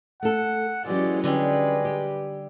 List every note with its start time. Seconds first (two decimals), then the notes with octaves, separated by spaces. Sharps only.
0.23 A3 A4 F#5
0.86 E3 F#3 G#3 C#4 G4 D5
1.24 D3 G3 G#3 C#4 B4
1.85 G4